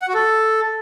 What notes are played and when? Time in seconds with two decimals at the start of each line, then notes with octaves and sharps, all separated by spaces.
0.02 F#5
0.08 F#4
0.14 A4